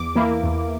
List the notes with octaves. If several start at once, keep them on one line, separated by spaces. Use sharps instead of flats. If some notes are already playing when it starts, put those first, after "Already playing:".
Already playing: E2 D6
E3 A#3 E4
E2